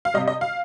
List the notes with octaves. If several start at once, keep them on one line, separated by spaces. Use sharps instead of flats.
F5
C3 G3 D#5
D#5
F5